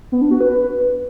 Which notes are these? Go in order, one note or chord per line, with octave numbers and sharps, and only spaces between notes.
B3
D4
F#4
B4